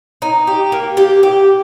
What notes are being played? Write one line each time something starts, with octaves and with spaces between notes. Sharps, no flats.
D#4
G4
A#3
G4
G4